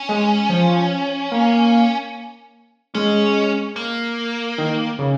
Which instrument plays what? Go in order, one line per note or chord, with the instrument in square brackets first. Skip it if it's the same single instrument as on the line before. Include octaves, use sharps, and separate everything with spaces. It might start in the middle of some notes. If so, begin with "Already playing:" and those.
Already playing: [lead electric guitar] C#4
[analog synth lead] G#3
F3
A#3
[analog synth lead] G#3 [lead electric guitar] C#4
[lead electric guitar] A#3
[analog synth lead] D#3
C#3